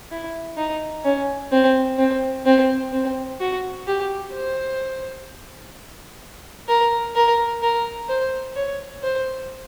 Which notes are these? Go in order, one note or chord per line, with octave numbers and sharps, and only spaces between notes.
E4
D#4
C#4
C4
C4
C4
C4
F#4
G4
C5
A#4
A#4
A#4
C5
C#5
C5